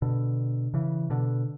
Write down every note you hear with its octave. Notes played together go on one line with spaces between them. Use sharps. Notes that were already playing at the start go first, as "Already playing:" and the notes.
B2 D3
C#3 E3
B2 D3